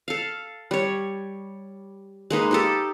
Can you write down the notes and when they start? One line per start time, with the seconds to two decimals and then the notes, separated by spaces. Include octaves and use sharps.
0.08 A4 F5
0.71 G3 C#5
2.30 G#3 A#3 D#4 B4
2.51 D#4 G4 A4